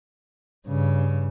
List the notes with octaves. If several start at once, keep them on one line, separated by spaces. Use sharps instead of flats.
G2 C#3